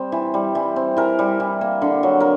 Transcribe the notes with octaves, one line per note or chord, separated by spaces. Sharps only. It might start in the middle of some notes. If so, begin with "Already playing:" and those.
Already playing: G3 C4
E3
G3
E3
C4
E3 A#4
G3
E3
A#3
D3
F#3
A#4